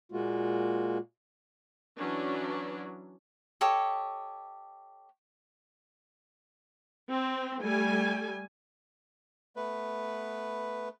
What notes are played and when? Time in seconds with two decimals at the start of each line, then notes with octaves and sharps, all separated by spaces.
0.12 A#2 G#3 A#3 F4 F#4
1.99 E3 F#3 C#4 D4
3.61 G4 A4 C#5 D#5
7.10 C4
7.62 G3 A3 G#5
9.56 A3 B3 B4